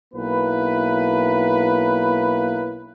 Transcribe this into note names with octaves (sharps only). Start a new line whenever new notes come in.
B1 A#3 E4 B4